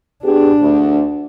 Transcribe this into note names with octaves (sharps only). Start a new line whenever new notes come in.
B3 D4 G4 G#4
D2